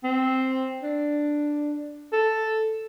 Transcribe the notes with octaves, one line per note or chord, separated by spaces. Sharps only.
C4
D4
A4